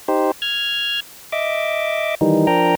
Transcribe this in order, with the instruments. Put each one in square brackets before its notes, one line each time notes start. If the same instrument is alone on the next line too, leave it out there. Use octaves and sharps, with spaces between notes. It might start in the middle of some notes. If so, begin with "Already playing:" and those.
[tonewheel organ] D#4 G4 C5
F6 G#6
D#5 E5 D6
D#3 E3 G3 D#4
F3 D4 A#4 G5 A#5